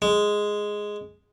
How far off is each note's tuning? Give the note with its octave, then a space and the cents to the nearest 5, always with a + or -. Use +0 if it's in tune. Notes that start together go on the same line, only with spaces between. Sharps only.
G#3 +0